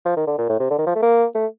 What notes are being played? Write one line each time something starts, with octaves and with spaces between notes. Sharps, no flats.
F3
D#3
D3
A#2
A2
C3
D3
D#3
F3
A3
A#3
A3